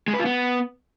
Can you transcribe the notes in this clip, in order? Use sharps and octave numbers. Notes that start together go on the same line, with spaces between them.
G#3
B4
F4
B3